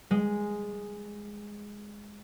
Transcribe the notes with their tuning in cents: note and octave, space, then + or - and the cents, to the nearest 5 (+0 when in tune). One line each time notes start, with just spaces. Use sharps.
G#3 -5